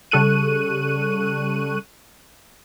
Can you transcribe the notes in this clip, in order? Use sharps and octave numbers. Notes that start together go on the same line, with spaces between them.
C#3 G3 A4 C#6 F#6 D#7